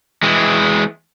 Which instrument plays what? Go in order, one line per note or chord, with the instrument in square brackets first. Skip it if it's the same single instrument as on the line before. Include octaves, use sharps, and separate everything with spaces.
[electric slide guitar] E3 G#3